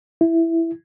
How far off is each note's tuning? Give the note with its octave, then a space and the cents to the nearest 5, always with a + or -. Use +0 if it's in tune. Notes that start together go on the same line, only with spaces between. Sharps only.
E4 +5